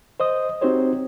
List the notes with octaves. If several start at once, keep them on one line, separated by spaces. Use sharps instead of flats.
C5 D#5 D#6
C4 D#4 F#4 G4 C5 C#5